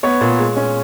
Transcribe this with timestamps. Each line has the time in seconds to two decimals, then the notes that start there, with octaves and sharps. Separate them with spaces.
0.03 B3 C#5
0.21 A#2
0.39 G#3
0.57 C#4